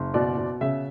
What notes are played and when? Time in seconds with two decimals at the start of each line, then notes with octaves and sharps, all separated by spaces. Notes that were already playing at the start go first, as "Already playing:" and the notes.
Already playing: F#1
0.14 B2 D5
0.37 B2
0.61 C#3 E5